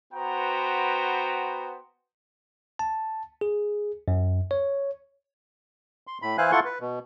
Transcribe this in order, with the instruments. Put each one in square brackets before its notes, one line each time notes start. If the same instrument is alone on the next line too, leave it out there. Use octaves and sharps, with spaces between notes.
[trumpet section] B3 F#4 B4 C5 G5 A#5
[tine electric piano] A5
G#4
F#2
C#5
[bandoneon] C6
A2 B5
E3 E4 C5 F5 G#5 F#6
E4 F4 A4 F#5 C6 C#6
B4
B2